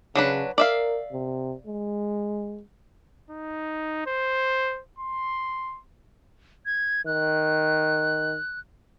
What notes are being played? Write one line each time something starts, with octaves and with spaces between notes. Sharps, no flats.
C#3 F#3 D4 B4
A#4 D5 E5 F5
C3
G#3
D#4
C5
C6
G#6
D#3 F#6